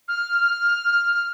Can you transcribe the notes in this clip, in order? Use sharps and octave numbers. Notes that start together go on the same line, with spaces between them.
F6